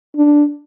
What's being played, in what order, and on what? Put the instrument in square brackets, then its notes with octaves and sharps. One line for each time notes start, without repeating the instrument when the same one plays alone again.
[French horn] D4